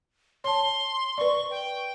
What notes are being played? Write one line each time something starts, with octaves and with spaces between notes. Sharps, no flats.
C#5 A5 C6
B4 D5 C#6
G5